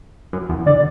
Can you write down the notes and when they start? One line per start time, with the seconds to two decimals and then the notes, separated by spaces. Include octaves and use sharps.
0.33 F#2
0.49 E2
0.66 D3 D5